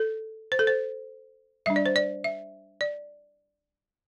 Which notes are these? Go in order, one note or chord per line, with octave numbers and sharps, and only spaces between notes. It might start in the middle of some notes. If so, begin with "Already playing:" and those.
Already playing: A4
C5
A4
C5
G3 D4 E5
D5
C5
D5
E5
D5